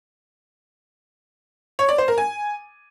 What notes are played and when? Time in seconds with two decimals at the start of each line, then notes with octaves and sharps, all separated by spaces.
1.79 C#5
1.89 D5
1.98 C5
2.08 A#4
2.18 G#5